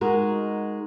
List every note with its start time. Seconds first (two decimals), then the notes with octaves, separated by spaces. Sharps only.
0.01 G#3 D#4 F#4 A#4